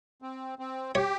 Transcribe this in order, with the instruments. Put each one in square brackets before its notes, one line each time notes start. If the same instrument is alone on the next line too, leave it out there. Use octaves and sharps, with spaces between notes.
[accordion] C4
C4
[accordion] G4 [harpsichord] C#5